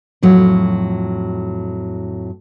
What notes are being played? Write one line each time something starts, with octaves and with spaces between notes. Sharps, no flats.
F2 A2 F#3